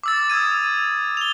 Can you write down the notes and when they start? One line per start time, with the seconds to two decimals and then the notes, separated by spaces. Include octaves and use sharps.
0.03 D6 E6 A6
0.30 D#6 E6 G#6 D#7
1.17 F7 G7